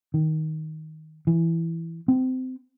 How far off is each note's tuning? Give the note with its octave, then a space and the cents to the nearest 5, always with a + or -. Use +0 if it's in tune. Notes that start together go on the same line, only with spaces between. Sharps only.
D#3 +10
E3 +5
C4 -25